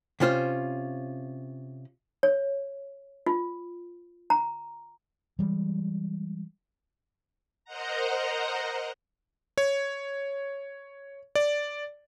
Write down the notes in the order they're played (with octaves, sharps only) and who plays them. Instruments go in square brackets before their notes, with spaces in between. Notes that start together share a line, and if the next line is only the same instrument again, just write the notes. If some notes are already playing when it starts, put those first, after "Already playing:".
[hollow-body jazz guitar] C3 C#4 F4 C5
[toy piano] C#5
F4
A#5
[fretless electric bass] E3 G3 G#3
[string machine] A#4 C5 D#5 F#5 A#5
[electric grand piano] C#5
D5